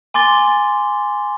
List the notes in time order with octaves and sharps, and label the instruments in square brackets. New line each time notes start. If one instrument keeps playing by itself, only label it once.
[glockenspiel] G#5 C6 D6 A6 G7